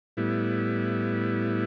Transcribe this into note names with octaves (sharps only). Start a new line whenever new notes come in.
A2 G3 B3 E4